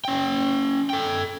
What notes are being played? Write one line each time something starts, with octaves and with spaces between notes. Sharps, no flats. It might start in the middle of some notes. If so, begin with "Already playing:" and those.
C#4 G5
A4 G5